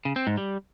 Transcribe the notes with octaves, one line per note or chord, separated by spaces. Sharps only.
C#3
C4
G#2
G3